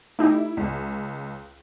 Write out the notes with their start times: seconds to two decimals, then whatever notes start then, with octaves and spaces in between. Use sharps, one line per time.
0.19 A3 D#4 E4 G4
0.57 C#2